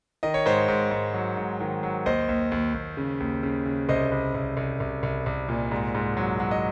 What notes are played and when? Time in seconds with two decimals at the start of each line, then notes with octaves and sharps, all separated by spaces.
0.23 D#3 D#5
0.34 C#5
0.46 G#2 C5 D#5
0.68 G#2
0.91 G#2
1.14 F#3
1.37 G#2
1.60 D#3
1.83 F#3
2.06 D#2 C5 D#5
2.29 D#2
2.52 D#2
2.74 D#2
2.97 C#3
3.20 D#2
3.43 C#3
3.65 C#3
3.89 C2 C5 D#5
4.12 C2
4.35 C2
4.57 C2
4.80 C2
5.03 C2
5.26 C2
5.49 A#2
5.72 G#2
5.95 G#2
6.17 F#3
6.40 F#3
6.51 D#5